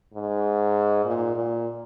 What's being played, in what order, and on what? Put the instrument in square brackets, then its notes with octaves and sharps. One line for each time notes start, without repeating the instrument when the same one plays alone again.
[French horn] G#2
A#2
A#2